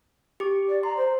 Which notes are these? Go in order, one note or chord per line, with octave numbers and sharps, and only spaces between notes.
G4 D6
D5
A#5 C6
C5